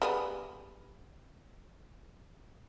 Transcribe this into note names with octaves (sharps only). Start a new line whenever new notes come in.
G3 B3 G#4